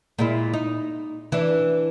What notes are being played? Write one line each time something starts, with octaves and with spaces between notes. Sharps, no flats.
A#2 G#3 E4
D#4
E3 D4